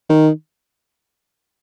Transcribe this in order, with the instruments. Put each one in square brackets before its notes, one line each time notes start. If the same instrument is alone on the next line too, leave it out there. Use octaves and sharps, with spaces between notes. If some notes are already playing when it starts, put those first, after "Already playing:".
[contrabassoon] D#3